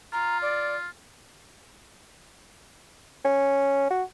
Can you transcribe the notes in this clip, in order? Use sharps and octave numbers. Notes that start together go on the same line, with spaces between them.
F4 A#5
D5
C#4
F#4